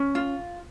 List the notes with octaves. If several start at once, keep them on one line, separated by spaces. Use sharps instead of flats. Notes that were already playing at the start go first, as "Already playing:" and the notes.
Already playing: C#4
F4